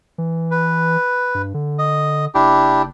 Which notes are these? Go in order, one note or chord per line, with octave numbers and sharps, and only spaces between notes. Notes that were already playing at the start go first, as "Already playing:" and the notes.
E3
B4
G2
D3
D#5
F#1 D4 E4 G4